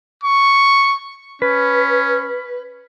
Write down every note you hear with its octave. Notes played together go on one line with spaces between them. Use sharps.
C#6
C#4 B4